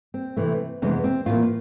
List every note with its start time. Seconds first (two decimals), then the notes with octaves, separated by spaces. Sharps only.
0.14 C4
0.36 C3 E3 A3
0.82 F2 C3 E3 G#3 B3 C#4
1.04 C4
1.26 A2 E3 G3 A#3 F4